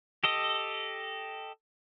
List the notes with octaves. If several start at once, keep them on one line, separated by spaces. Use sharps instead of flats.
G4 A4 D#5